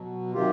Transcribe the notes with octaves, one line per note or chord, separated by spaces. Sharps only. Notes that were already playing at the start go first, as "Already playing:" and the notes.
Already playing: B2 F#3
C3 D#3 F#3 F4 G4